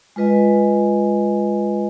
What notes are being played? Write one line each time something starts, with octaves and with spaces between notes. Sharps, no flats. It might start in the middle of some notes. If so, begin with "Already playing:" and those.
G#3 F4 B4 D#5 G#5